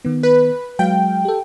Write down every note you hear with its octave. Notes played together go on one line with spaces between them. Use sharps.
D#3 B3
B4
F#3 G#3 F5 G5
G4 A4